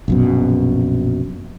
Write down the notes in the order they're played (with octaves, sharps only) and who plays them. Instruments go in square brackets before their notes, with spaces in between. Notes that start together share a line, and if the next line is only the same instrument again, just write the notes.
[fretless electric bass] A#1 F#2 B2